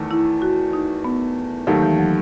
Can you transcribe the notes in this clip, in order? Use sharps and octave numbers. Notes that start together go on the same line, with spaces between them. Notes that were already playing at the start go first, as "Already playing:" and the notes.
Already playing: E2 D#3 A3
E4
F#4
D#4
B3
D#2 D#3 F#3 A3
E3
F#3